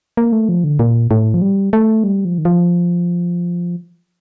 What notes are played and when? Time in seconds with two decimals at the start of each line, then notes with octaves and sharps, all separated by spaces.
0.17 A#3
0.32 A3
0.49 F3
0.64 D3
0.79 A#2
1.11 A2
1.34 F3
1.42 G3
1.73 A3
2.04 G3
2.25 F3
2.38 D#3
2.45 F3